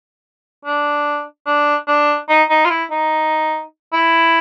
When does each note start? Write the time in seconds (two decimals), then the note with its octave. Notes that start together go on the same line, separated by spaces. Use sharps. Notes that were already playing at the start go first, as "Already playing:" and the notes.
0.65 D4
1.47 D4
1.88 D4
2.29 D#4
2.50 D#4
2.65 F4
2.70 E4
2.91 D#4
3.93 E4